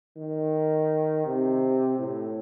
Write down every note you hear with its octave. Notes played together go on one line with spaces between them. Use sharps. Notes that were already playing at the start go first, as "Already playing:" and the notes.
D#3
C3
A2